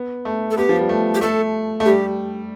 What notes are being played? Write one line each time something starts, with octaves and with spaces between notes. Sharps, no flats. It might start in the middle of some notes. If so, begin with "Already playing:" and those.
Already playing: B3
A3
A4
B3 G4
F3
G3
A3
G4
A3 A4
A3
G3 G4